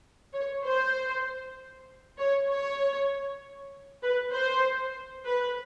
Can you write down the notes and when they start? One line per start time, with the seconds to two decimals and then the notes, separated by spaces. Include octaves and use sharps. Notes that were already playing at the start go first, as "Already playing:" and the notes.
0.34 C#5
0.64 C5
2.18 C#5
2.49 C#5
4.03 B4
4.33 C5
5.25 B4